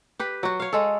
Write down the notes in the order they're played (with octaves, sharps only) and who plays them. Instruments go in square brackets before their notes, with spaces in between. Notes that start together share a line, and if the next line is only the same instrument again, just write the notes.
[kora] G4 B4
F#3 F#4
C#5 F5
G#3 G#4 A4